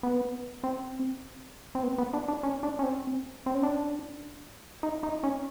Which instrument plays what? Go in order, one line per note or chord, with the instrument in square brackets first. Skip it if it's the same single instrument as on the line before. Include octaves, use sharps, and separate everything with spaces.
[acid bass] B3
C4
C4
B3
B3
D4
D4
C#4
D4
C#4
C4
C4
C#4
D4
D#4
D#4
C#4